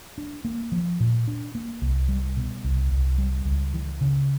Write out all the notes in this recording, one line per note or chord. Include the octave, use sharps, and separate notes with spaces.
D4
A#3
F3
A#2
D4
A#3
C2
G3
B2
C2
C2
G3
C#2
E3
C#3